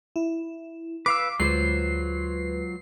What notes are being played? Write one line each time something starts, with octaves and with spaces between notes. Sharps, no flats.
E4
B4 F5 D6 E6
D2 F#3 G#3 F4 B4 C5 C7